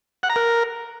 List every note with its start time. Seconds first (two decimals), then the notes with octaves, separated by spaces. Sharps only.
0.23 F#5
0.30 A#5
0.36 A#4